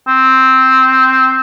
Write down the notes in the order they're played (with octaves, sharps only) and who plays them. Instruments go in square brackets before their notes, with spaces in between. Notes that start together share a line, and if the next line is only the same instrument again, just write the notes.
[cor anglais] C4